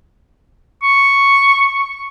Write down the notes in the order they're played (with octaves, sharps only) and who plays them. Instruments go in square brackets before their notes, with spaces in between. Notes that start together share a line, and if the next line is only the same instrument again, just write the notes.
[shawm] C#6